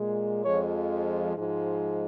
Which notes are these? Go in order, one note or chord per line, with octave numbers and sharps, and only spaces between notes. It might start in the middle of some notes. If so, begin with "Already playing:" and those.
Already playing: A#2 G#3
F2 F3 G#3 C#5
G#2 F3 G#3